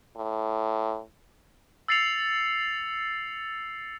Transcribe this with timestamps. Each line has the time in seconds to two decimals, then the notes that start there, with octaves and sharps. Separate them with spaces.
0.17 A2
1.88 E6 A6 C7 C#7 F7